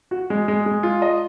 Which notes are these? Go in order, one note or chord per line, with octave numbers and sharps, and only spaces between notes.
F#4
G#3
G#3
G#3
F4
D#5